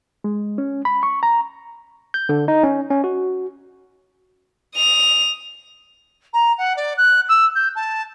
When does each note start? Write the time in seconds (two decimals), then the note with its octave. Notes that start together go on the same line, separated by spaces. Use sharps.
0.24 G#3
0.58 C#4
0.85 B5
1.03 C#6
1.23 A#5
2.14 G6
2.29 D3
2.48 D#4
2.63 C#4
2.90 C#4
3.04 F#4
4.75 D#6 F7
6.33 A#5
6.58 F#5
6.76 D5
6.97 F#6
7.28 E6
7.55 G6
7.75 A5